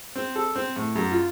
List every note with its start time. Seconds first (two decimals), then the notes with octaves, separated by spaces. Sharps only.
0.16 C4
0.36 A4
0.55 C4
0.76 A2
0.96 F#2
1.11 F4